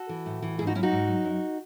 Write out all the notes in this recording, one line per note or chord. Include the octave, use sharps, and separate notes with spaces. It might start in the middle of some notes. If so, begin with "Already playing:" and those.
Already playing: F#4 A4
E3
A2
E3
G#2 E4 G#4
D#4 F#4
F#3 C#4 E4
D#4 F#4
G#2
F#3
F#2